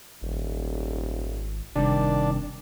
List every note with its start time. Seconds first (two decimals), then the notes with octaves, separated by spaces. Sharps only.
0.22 D#1 G#1
1.76 F#1 C3 D#3 G3 D4